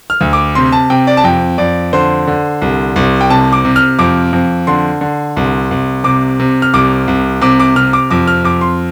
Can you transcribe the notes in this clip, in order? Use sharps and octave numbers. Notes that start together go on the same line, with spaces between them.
F6
D2
D6
C3 C6
A5
C3 G5
D5
A5
F2 G5
F2 D5
D3 C5
D3
C2
C2
G5
C3 A5
D6
C3
F6
F2 D6
F2
D3 C6
D3
C2
C2
C3 D6
C3
F6
C2 D6
C2
C3 D6
D6
C3 F6
D6
F2 D6
F6
F2 D6
C6